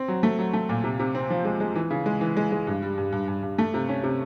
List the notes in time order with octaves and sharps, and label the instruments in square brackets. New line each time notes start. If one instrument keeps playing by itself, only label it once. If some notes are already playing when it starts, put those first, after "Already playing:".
Already playing: [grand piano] C4
F#3
A3
F#3
A3
A#2
C3
C3
C4
F3
G#3
G#3
E3
C#3
G#3
E3
G#3
G#3
G2
G3
G2
G2
G2
G2
A3
C3
C#4
C3